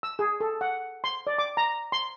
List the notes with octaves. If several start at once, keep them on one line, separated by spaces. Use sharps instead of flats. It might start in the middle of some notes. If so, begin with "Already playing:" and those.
E6
G#4
A4
F#5
C6
D5
D6
A#5
C6